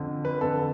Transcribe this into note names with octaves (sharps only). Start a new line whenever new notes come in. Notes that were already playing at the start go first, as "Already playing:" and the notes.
Already playing: F2 D3
B4
F2 D3 A4